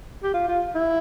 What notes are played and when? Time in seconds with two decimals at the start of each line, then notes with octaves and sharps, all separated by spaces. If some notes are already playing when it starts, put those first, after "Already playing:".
0.23 G4
0.34 F4
0.48 F4
0.75 E4